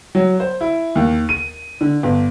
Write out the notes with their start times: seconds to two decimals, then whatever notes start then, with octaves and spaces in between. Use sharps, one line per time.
0.15 F#3
0.40 C5
0.61 E4
0.95 D#2
1.29 D#7
1.81 D3
2.03 G1